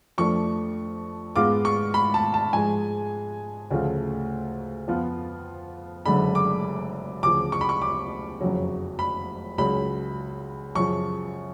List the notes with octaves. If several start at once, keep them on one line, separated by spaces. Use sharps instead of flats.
F2 F3 A3 D4 C#6
G#2 G#3 B3 F4 D6
C#6
B5
A5
A5
G#2 F3 G#3 G#5
D2 C#3 F3 A3 F4
F2 F3 B3 F4
F#1 F#2 D3 G#3 D4 B5
D6
D2 C#3 F3 D6
C#6
B5
C#6
D6
F#1 F2 C#3 F#3
B5
C#2 C#3 F#3 B5
F#2 C#3 F3 C#6